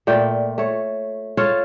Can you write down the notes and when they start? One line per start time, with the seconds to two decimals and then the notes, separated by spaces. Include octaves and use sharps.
0.07 A#2 A3 D5 G5
0.58 A3 C#5
1.37 F4 A4 C#5 F5